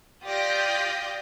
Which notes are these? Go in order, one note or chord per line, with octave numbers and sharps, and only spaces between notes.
F4 G4 D5 D#6 G6 A#6